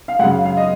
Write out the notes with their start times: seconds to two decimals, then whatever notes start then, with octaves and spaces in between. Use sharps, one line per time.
0.08 F5
0.19 F#2 C#3 F#3 F#5
0.32 F5
0.45 F5
0.57 D#5